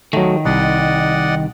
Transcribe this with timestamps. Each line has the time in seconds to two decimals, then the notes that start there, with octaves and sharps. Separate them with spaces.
0.13 D#3 F#3 A3
0.45 C2 D5 D#5 F#5